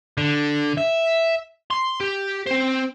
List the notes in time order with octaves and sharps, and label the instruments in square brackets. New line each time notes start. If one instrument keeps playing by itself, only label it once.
[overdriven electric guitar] D3
E5
C6
G4
C4 C5